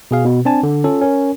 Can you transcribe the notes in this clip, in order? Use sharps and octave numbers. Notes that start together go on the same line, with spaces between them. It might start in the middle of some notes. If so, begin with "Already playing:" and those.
B2 G#4 F5
B2
C4 D4 G#5 A5
D3
C#4 F4 A4
C#4 A#4